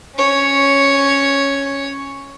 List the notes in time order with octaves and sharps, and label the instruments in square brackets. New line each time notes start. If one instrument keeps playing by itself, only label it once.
[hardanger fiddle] C#4 C#5